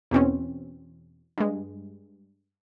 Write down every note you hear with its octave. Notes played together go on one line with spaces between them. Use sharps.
E2 B2 C4 C#4
G2 G#3